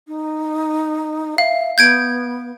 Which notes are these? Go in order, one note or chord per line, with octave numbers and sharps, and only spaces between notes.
D#4
E5 F5
B3 G6 G#6 D7